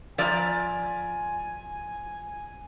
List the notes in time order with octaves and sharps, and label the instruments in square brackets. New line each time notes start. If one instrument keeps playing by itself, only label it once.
[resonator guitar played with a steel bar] F3 D5 A#5 [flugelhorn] G#5